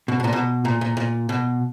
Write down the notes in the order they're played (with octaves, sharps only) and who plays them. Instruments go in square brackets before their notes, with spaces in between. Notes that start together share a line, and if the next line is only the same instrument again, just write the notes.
[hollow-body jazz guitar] B2
B2
A#2
B2
A#2
A#2
A#2
B2